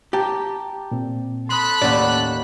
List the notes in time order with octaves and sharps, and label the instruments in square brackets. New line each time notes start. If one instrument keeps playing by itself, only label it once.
[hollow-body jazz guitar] G4 [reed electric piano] G5 A5 A#5
[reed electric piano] A#2 C4
[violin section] A4 B5 F#6 [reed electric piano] C6 D#6
[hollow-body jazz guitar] D#2 D5 [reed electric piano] A2 C#4 F#5